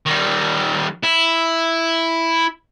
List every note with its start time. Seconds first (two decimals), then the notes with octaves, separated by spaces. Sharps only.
0.06 D#3 G3
1.03 E4